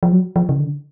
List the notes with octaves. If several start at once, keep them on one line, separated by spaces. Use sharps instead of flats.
F3
F#3
F3
C#3
D3